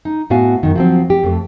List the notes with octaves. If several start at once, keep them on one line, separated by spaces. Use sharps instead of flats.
D#4
A2 B3 F#4 F5 G#5
F#2 D#3
F3 F#3 C4
G4
F2 A3